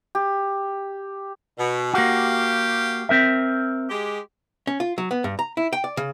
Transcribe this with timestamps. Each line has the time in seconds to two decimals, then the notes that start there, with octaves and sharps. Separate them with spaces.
0.15 G4
1.58 B2
1.94 A#3 F#4 G4 F5
3.09 C4 A#4 E5
3.89 G#3 G4
4.67 C#4
4.80 F4
4.98 F#3
5.11 B3
5.24 G2
5.39 A#5
5.57 E4
5.73 G5
5.84 D5
5.97 C#3